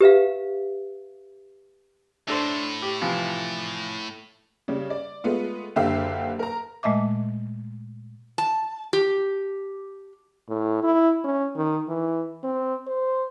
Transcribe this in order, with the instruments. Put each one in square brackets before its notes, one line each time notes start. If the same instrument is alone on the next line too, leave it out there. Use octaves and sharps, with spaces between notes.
[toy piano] G4 B4 E5 F5
[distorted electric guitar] A2 [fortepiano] D4 A4 C5
[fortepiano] G4
C3 E3 F3
[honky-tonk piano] C#3 G3
D5
G#3 A3 B3 F4
F#1 D3 G4 E5 F5 E6
A#4 A#5
[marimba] A#2 G#3 A3 D#5 E5 D6
[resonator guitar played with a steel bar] A5
G4
[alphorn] A2
E4
C#4
D#3
E3
C4
C5